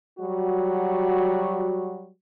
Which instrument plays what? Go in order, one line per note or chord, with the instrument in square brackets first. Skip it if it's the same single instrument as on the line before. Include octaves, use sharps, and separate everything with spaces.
[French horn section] F#3 G3 F#4